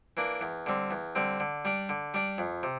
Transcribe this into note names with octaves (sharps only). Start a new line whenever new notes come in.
E3 A#3 D4
E2
D3 G3 C4
E2
D3 G3 C4
D3
G3 D4
D3
G3 D4
F2
C3